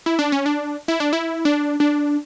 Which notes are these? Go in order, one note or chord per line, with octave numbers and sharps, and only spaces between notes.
E4
D4
C#4
D4
E4
D4
E4
D4
D4